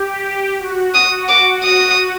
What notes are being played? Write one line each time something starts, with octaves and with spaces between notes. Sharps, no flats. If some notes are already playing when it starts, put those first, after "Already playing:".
Already playing: G4
F#4
F#4 D#6
F#4 D6
D#6